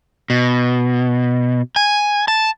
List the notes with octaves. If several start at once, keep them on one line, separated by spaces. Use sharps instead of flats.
B2
G#5
A5